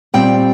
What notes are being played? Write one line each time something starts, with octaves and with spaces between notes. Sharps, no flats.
A#2 G3 C4 G5